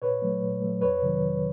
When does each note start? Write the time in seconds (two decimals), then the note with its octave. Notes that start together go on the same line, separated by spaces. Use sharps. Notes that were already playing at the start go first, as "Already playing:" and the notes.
0.02 A#2 B4 C#5
0.22 F#3 A3
0.42 A#2
0.61 F#3 A3
0.81 F2 B4 C#5
1.01 C3 D#3 F#3
1.21 F2